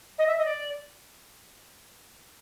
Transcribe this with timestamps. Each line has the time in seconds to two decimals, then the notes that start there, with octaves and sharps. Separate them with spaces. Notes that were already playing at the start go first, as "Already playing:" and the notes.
0.18 D#5
0.27 E5
0.38 D#5
0.45 D5